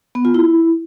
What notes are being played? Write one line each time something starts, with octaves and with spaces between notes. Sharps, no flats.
B3
F4
E4